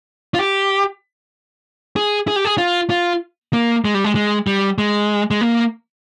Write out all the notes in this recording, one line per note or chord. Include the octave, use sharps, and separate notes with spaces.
F4
G4
G#4
G#4
G4
G#4
F4
F4
A#3
G#3
G3
G#3
G#3
G3
G#3
G#3
A#3